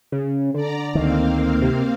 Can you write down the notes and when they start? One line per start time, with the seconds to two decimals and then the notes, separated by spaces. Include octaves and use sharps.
0.12 C#3
0.54 D3 D5 A#5
0.95 D2 D#3 A#3 C4 F5
1.61 C3